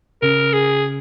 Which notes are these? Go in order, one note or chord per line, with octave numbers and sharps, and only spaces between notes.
C#3 A#4
G#4